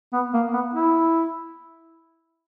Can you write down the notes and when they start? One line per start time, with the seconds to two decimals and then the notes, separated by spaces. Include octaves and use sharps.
0.13 B3
0.34 A#3
0.53 B3
0.74 E4